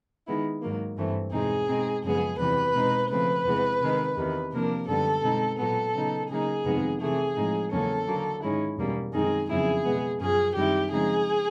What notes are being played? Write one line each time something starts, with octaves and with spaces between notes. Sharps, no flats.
D#3 G#3 B3 E4
G#2 D#3 F#3 A#3
G2 E3 A3 C4
E2 B2 G#3 C4 D#4 G#4
B2 G#3 C4 D#4
F#2 C#3 F3 G#3 B3 G#4
E2 C3 E3 G3 B4
B2 G#3 C4 D#4
C#3 F3 A3 C4 B4
E2 C3 E3 G#3 B3
C3 D#3 G#3
E2 C3 D#3
C3 F3 A#3 D4 A#4
F#2 D3 G3 B3 A4
B2 G#3 C4 D#4
A#2 F#3 B3 A4
C#3 F#3 B3 D#4
C#3 F#3 A#3 D#4 G#4
F2 C3 D#3 G#3 B3
C3 E3 A3 G#4
A2 F3 G#3 C4 D#4
E2 C#3 F#3 A#3 C#4 A4
D3 F#3 A#3
G#2 D#3 G#3 C#4 E4
E2 B2 G3 A#3 C#4
F#2 D#3 G#3 C4 D#4 G#4
F2 C#3 F#3 B3 E4 G#4
B2 G#3 B3
F#2 C#3 F3 G#4
F#2 D#3 G3 C4 E4 G4
C#3 F3 G#3 C4 D#4 G#4